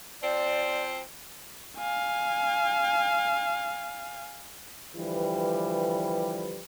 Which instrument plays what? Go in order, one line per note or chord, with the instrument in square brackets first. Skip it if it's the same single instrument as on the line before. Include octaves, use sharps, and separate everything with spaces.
[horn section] F3 C4 [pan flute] D5
[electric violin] F5 G#5
[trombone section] D3 E3 F3 G3 G4 B4